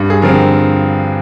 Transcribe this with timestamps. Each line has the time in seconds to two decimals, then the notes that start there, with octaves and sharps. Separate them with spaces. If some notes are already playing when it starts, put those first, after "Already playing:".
Already playing: G2
0.10 G#4
0.22 D3 F3 C4 A#4